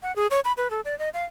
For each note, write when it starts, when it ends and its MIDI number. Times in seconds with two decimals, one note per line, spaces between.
0.03 0.14 78
0.16 0.27 68
0.31 0.40 73
0.45 0.52 83
0.57 0.70 71
0.70 0.81 69
0.85 0.97 74
0.99 1.09 75
1.14 1.25 77